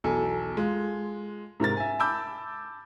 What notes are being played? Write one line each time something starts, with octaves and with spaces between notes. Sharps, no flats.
B1 E2 B2 A4 G#5
G#3 F4
G#2 C3 A#4 A6
E5 G#5
A5 B5 D6 E6 G6